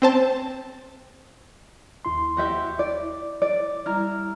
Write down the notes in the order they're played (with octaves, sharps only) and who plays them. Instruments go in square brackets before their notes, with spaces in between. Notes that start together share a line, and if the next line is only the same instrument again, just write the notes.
[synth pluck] C4 C5 A5
[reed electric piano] D#2 E4 C6
[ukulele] F#4 G4 E5
[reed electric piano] E4 [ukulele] D5
[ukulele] D5
[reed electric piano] G3 A#5 F6 [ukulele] E4